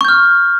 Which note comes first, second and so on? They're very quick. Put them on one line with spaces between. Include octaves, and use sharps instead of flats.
C#6 G6 F6